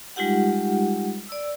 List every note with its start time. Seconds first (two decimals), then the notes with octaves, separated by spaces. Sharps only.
0.16 G3 G#3 D#4 F4 G4 F#5
1.28 D5 E6